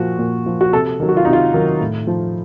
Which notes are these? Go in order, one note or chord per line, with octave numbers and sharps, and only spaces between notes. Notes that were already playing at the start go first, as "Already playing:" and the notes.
Already playing: A#2 F3 F#4
A#2
F3
F#4
C3 A4
D#3 F#3
F#4
F4
C3 D#4
F4
D#3 F#3
A2
F3